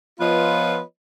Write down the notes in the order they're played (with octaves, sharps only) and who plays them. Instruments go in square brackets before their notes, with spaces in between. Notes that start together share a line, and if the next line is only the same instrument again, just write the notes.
[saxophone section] F3 B3 F4 B4 C#5 D#5